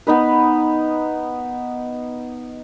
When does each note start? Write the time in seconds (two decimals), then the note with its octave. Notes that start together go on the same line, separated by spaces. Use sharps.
0.07 B3 D#4 B4